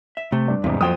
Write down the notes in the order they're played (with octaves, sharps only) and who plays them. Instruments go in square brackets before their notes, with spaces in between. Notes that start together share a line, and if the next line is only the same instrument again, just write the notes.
[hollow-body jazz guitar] E5
[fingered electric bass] C3 [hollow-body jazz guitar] A3
[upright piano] G2 D4
[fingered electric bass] E2 G#2 [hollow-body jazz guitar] C3
[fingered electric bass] F2 [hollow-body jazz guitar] A#2 F3 F#3 [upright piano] C5 G5 D#6